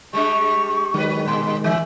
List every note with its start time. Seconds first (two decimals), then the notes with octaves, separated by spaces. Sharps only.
0.13 G3 G#3 D4 C#6
0.94 D#3 F#3 G#3 B4
1.28 A#2 C6
1.64 E3 E5